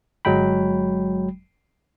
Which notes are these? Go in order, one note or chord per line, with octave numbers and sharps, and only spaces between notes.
G1 F#3 G#3 G5 B5